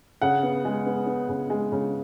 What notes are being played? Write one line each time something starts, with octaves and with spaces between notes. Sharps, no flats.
C#3 F#5
B3
G#3
B3
B3
C#3
G#3
C#3